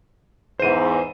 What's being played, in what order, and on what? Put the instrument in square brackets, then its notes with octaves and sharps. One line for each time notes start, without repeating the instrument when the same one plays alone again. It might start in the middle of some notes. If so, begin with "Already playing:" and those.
[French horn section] E2 G#2 [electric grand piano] C5 D#7